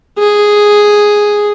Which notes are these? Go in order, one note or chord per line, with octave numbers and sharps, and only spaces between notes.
G#4